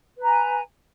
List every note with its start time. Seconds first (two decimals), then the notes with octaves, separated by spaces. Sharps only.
0.18 B4
0.22 A#5
0.25 G#5